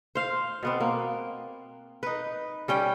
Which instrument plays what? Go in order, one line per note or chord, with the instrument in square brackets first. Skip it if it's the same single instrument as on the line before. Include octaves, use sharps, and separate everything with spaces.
[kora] C5 F5
B2 B3 C4
A#3
D#4 B4
G3 C#4 G5